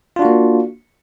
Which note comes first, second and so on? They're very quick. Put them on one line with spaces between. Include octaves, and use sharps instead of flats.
F4 D4 F#4 A#3